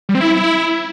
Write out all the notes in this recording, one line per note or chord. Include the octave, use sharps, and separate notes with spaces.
G3
C4
E4